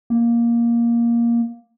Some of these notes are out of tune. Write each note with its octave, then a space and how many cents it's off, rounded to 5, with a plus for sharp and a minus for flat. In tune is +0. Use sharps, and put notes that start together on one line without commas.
A#3 +10